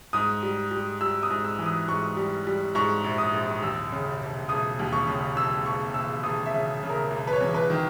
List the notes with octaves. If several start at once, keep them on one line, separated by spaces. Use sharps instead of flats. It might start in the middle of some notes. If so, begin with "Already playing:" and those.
G#2 D#6
G3
G3
G3 E6
D#6
G#2
E6
E3
D#6
G#2 C#6
G3
G3
G#2 C#6
A#1
D#6
A#1
D#2 E6
C#3
E1
E1 D#6
D#2
C#6
C#3
E1 E6
E1 C#6
E1 E6
E1 D#6
E5
C#3
C#3
A#4
E1
B4
C#5
E2
B4
D#3